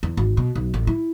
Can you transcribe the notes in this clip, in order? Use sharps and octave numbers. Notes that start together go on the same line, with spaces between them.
E2
G#1
B2
B1
A1
E4